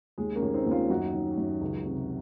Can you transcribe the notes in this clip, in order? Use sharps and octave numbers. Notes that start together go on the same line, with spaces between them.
D#2 G#3
A#3 C#4
D#2
C4 D#4
D#2
C#4 F4
F#2 D#4 F#4
D#3
F#2
C#2
C3